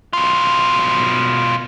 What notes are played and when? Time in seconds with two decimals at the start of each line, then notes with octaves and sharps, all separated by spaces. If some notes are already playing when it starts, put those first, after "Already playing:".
0.13 B2 F4